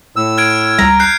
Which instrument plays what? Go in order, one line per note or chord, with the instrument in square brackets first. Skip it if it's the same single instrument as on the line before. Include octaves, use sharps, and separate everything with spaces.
[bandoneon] A2 E6
[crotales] F6 G#6 D7
[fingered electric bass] C#2 G3 [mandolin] A#5
[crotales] F#6 G6 C7